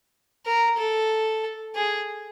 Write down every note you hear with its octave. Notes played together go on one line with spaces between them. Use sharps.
A#4
A4
G#4